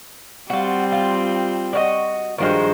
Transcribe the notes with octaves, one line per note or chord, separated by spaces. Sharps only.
G3 C4 F4 F#4
F4
D4 F#4 D#5
G2 D#3 F3 G#3 F#4 C5